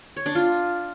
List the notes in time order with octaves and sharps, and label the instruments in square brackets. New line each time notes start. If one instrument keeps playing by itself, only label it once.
[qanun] C#5
D4
F4